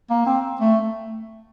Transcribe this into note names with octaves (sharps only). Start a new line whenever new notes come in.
A#3
C4
A3